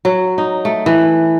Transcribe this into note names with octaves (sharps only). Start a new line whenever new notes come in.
F#3
D#4
A3
E3